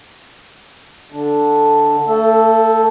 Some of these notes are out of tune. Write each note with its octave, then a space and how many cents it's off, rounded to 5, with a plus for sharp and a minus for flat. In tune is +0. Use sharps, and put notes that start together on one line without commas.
D3 +0 D4 +0
A3 +35 A4 +0